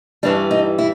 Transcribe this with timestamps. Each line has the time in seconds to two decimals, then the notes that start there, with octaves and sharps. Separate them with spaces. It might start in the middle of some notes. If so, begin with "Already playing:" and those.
0.23 G2 E3 G3 D4
0.51 D#4
0.78 E4